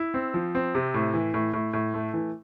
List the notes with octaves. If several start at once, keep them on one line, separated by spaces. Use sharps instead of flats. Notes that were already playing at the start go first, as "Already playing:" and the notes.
Already playing: E4
C4
F3
C4
C3
A2
E3
A2
A2
A2
A3
E3